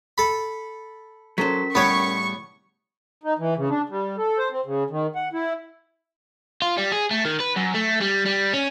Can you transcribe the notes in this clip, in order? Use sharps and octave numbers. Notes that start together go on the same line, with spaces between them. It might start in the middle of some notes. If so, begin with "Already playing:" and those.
A4 B5
F#3 C#4 A4 A#4 C5 B6
A2 G3 B3 G4 C#5 C#6
D#4
E3
C#3
D4
G3
A4
C5
C4
C#3
D#3
F#5
E4
F4
G3
G#4
A3
D#3
B4
F#2
A3
G3
G3
C#4